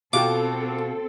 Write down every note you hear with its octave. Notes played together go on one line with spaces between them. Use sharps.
B2 C4 F4 F#4 A4 G5 D6